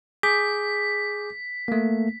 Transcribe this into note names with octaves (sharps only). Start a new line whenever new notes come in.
G#4 D6 G6 B6
A3 A#3